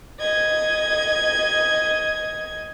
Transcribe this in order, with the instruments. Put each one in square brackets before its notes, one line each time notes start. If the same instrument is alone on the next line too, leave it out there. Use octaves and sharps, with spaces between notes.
[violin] D#5 G#6